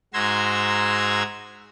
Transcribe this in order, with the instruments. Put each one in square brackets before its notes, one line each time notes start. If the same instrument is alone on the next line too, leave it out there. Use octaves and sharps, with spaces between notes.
[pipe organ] G#2 F#4 A#5 C6 E6 G#6